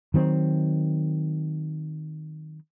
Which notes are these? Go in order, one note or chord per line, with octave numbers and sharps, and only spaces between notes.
D#3 F#3 C4